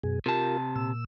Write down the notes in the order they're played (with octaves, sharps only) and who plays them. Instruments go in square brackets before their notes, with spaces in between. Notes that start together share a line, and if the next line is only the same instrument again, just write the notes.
[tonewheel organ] F#2 B2 G#4
[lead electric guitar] C3 A5 [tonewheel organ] F4 G4 A#4
[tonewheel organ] A#2 E6